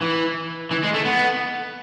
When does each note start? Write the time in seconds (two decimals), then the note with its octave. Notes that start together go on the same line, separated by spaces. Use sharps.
0.02 E3
0.71 E3
0.83 G#3
0.94 A3
1.06 B3